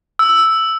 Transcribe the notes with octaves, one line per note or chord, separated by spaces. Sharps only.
E6